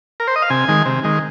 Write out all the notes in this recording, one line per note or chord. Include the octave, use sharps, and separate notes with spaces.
A#4
C5
D#5
F5
C3 G#5
D#3 G#3
C3
D#3 G#3